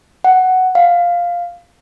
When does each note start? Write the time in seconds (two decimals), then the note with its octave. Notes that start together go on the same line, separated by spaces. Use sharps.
0.24 F#5
0.75 F5